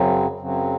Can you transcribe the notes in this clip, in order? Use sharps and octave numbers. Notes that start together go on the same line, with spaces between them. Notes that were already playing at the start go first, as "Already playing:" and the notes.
Already playing: F#2 C#3 F#3 C4
F#2 C#3 F#3 C4